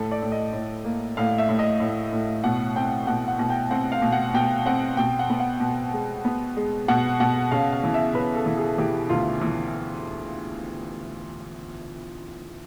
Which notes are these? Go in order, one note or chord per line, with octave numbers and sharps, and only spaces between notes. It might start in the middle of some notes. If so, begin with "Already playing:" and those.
Already playing: A2 A4
D5
A2
D#5
A2
A#3
A2 F5
E5
A2
D#5
A2
A2
B2 F#5
C4 G5
B2 F#5
F#5
B2
G5
C4 F#5
F5
B2
F#5
B2 G5
C4 F#5
B2 G5
F#5
B3
F#5
B2
G#3
B3
G#3
B2 F#5
B2 F#5
C#3 F5
F5
E3
E5
C#3 B4
A4
E3
G#4
E3 G4
D2 F4
E3